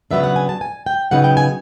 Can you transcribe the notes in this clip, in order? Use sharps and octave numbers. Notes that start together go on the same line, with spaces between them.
C#3 F#3 B3 D4 E5
F#5
G#5
A5
G#5
G5
C#3 F#3 B3 D#4 F#5
G5
G#5